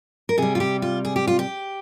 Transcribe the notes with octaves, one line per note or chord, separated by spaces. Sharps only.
A#4
C3 G3 G#4
F4
G4
F4
G#4
G4
F4
G4